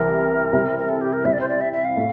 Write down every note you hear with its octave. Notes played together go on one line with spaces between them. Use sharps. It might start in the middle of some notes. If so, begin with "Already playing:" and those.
Already playing: C2 C3 E3 G3 A#4
C3 G3 C4 E4
A#4
A4
G4
A#4
C3 G3 C4 E4 E5
D5
C5
D5
E5
E5
F5
A2